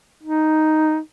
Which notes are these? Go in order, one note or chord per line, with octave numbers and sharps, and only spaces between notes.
D#4